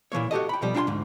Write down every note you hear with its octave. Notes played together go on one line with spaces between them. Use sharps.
A#2 E3 A#3 C#5
F#4 G4 A4 D#5
G5 B5
B2 F3 G3 G4
D4 F4 G5 G#5 C6
D2 G#2